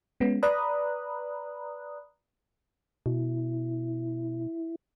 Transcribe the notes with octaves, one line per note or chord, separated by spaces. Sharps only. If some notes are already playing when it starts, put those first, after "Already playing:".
G#3 B3 C#4
B4 D5 A#5 B5 D#6 F#6
B2 E4